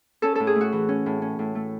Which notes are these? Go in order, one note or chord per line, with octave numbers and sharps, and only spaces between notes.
C#4 A4
A2 A4
G#4
A3
F#4
E3
C#4
A2
C#4
A2
A3